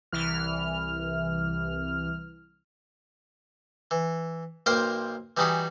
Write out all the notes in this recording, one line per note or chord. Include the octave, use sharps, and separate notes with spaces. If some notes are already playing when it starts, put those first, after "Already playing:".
C2 E3 F6
E3
B1 A#3 A#4 C5 F5 G5
E3 G3 D#4 E4 F#4 G#4